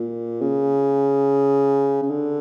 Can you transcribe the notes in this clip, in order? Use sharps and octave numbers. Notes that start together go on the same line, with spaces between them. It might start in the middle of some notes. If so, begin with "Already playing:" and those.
Already playing: A#2
C#3
C#3
D3